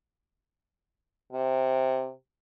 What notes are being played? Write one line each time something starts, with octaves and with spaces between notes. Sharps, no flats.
C3